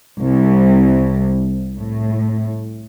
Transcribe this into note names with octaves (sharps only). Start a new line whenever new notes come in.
C2
A2